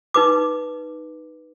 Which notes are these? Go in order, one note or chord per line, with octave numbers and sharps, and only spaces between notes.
D#4 B4 D6